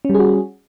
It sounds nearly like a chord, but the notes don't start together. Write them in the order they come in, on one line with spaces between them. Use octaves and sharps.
C#4 G3 G#4 F#4